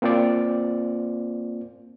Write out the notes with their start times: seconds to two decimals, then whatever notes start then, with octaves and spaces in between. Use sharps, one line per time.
0.02 A#3 C4 F4 C5 D5